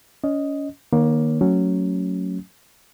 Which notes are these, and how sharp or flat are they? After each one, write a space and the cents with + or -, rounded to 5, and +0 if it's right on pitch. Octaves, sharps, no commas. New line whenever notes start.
C#4 +25 D#5 +0
D#3 -30 A#3 +20 C#5 +0
F#3 +0 A3 +25 C#4 +0